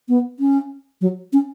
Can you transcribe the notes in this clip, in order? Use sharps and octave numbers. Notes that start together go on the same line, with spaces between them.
B3
C#4
F#3
C#4